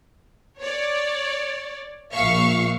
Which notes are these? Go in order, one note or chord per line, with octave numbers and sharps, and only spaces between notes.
C#5 D5
A#1 A#2 E5 F5 C#6